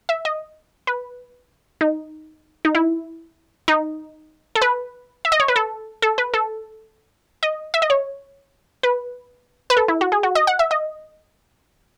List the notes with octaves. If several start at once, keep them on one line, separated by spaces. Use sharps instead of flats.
E5
D#5
B4
D#4
D#4
E4
D#4
A4
B4
E5
D#5
C#5
B4
A4
A4
B4
A4
D#5
E5
D#5
C#5
B4
B4
A4
E4
F#4
G#4
F#4
D#5
F#5
E5
D#5